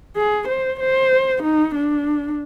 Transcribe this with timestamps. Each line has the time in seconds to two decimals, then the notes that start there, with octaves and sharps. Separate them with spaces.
0.16 G#4
0.48 C5
0.80 C5
1.43 D#4
1.75 D4